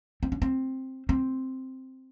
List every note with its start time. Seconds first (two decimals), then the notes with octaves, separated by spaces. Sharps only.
0.23 C4
0.32 C#4
0.42 C4
1.09 C4